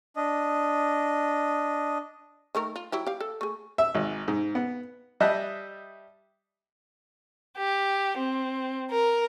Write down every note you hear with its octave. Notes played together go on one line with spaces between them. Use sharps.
D4 D#5
D#3 A3 A#4
F4
F#3 E4 G4
G4 F5
A4
A3 G#4
E5
G#1
G#2
B3
G3 D#5 E5 A5 F#6
G4
C4
A#4